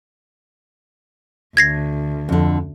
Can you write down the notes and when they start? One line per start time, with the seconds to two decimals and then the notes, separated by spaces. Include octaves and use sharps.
1.57 D2 G#6 A#6 C7
2.29 F2 D3